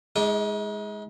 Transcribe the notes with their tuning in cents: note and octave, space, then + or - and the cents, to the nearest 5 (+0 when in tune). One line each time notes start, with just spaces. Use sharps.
G#3 +0 D#4 +45 D6 +0